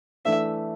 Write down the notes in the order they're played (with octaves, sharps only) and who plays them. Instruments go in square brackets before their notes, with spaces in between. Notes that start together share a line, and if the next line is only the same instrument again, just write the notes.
[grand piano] E3 A3 D4 [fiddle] E5